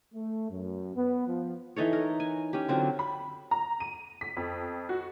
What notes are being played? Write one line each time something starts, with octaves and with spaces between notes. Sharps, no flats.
A3
F#2
B3
F3
E3 D#4 A4 C#5
A#4
G#5
C#4 G4
D3 F#3 C4 F4
B5
A#5
D#7
B6
F2
F#4